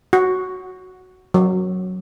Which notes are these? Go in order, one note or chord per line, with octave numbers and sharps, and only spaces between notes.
F#4
F#3